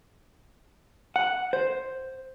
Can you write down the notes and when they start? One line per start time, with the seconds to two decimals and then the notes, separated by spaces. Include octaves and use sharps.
1.16 F#5
1.53 C5